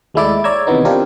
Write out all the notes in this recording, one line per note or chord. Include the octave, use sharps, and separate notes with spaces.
D#2 G#3 A3 E4 D5 D6
C#5 D5 A#5 E6 G#6
C3 D#3 E3 B3 D#4
C4 D4 F4 G4 A#4